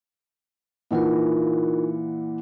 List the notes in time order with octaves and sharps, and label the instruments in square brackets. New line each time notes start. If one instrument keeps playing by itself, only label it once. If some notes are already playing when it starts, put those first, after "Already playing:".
[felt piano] A#2 E3 F#5 [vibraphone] D#4 F4 A#4